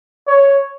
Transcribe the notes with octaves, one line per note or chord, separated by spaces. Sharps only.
C#5